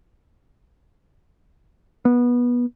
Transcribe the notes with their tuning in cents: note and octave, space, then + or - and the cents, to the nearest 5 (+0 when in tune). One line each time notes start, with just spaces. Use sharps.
B3 -20